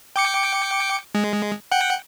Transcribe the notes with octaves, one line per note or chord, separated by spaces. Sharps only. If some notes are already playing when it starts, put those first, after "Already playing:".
G5 D6 C#7
G#3
F#5 G5